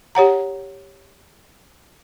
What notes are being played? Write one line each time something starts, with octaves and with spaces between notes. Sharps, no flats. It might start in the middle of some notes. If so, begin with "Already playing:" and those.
G4 C#5 F#5 A#5